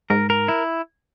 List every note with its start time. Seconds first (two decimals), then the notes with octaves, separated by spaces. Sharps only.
0.10 G#2 A#4
0.30 A#4
0.48 E4